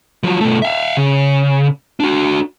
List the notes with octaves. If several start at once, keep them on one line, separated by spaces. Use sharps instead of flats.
F3 F#3
B2 A3
E5 F5
C#3
D4 F#4